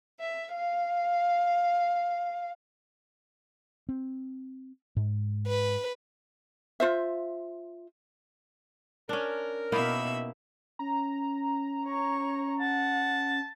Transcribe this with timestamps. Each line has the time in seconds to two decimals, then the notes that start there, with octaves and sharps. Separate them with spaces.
0.21 E5
0.53 F5
3.89 C4
4.96 G#2
5.47 B4
6.80 F4 C5 E5
9.09 C#4 D4 A#4
9.72 B2 A#3 D#4 E4 E5 B5
10.79 C#4 A#5
11.86 C#5 C#6
12.60 F#5 A5